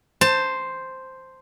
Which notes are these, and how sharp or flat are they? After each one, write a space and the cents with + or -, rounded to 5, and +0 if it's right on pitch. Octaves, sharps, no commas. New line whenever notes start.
C5 +0 A5 +20